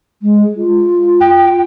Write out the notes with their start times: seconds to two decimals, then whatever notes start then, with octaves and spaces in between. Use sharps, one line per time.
0.22 G#3
0.57 F4
1.20 G5